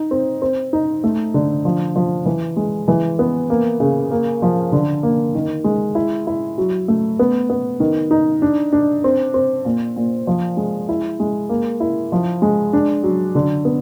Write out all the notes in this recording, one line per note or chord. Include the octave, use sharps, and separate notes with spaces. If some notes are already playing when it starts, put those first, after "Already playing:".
Already playing: D#4
C4
C4
D#4
A3
D3
F3
F3
E3
G#3
E3
B3
A#3
C#3
A#3
F3
D3
A#3
D#3
G#3
E4
E4
F#3
A3
B3
B3
D#3
D#4
D4
D4
C4
C4
A#2
A#2
F3
G#3
E4
G#3
A#3
E4
F3
G#3
D4
F#3
D3
B3